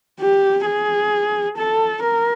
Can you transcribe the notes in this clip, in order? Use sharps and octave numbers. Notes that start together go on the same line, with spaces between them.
G4
G#4
A4
A#4